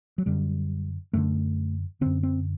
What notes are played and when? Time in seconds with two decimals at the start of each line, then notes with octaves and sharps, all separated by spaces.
0.18 F#3
0.26 F#2 D3 G3
1.13 F#2 D3 A3
2.01 F#2 D3 C4
2.23 C4